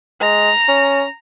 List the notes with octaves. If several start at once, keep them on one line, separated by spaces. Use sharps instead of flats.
G#3 A#5
C#4